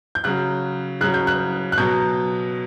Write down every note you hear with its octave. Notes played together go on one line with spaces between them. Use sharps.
G6
C#3 F#3 F#6
C#3 F#3 F#6
G6
F#6
F#6
B2 F#3 G6